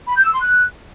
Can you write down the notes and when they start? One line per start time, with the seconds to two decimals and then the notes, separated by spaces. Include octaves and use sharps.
0.08 B5
0.16 G6
0.24 E6
0.33 C6
0.41 F#6